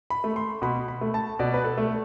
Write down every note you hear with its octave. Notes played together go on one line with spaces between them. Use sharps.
B5
A3
C6
B2 B5
B5
A3
A5
B2 D5
B4
A4
A3